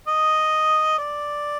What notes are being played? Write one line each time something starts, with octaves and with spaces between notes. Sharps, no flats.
D#5
D5